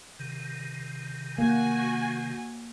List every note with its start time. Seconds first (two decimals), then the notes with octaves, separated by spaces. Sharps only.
0.19 C3 D#3
1.38 A#3 F#4 G#5